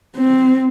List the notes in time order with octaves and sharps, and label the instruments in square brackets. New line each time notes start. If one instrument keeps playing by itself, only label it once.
[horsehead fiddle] C4